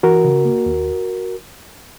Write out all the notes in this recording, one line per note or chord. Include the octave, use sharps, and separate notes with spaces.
E3 F#4 A#4
C#3
A#3
D#2